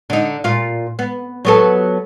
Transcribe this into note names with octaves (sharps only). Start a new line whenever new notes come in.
D3 D#4
A#2 F4
B3
F#3 B3 A4